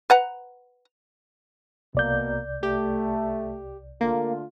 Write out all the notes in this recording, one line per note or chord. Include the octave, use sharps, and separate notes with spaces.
B4 F#5 A#5
C2 B2 A#3 D5 G6
A3 G4
D3 A3 A#3 F4